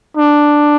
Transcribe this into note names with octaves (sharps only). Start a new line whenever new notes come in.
D4